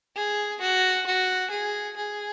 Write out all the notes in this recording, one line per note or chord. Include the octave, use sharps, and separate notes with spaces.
G#4
F#4
F#4
G#4
G#4